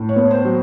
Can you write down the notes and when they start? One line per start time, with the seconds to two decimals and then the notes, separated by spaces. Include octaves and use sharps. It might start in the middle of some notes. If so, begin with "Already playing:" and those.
Already playing: A2
0.09 C#5
0.16 B3
0.31 C5
0.45 F#3